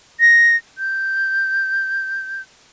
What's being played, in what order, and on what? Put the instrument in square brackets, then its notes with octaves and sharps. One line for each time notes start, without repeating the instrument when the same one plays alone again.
[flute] A#6
G6